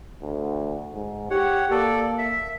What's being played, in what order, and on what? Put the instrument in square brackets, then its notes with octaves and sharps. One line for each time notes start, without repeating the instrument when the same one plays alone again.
[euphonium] D2
G#2
[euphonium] G4 [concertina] C#5 F#5
[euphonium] A#3 [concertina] A4 D5
[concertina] E5